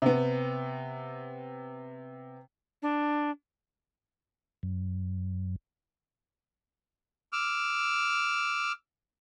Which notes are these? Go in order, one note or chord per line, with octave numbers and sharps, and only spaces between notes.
C3 B3
D4
F#2
D6 E6 F6